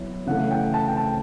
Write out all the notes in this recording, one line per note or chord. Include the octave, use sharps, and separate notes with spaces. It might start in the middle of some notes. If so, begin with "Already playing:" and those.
Already playing: F#3 B3 E4
C#3 E3 A3 F#5
G5
A5
G5
A5